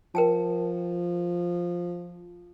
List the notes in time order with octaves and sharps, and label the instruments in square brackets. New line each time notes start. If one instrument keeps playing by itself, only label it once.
[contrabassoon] F3 [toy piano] A#4 G5 A5